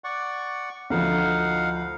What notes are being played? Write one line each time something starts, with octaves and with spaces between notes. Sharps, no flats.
D5 F#5 C#6
D2 F3 D#4 F5 F#5